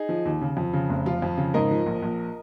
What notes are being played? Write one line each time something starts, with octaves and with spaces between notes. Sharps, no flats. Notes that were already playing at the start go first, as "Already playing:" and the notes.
Already playing: D#4 G#4
F3
D#2
C#3
F2
C#3
F1
F3 F4
F2
C#3
G#2 A#4 D#5
F3
A#1
A#1